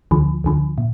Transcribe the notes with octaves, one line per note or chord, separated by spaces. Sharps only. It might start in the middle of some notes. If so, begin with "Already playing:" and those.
D2 D3 F3
D2 D3 F3
A#2